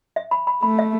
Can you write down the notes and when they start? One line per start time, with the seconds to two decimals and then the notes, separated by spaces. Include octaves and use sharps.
0.16 E5
0.31 B5
0.47 B5
0.63 A3 B5
0.79 E5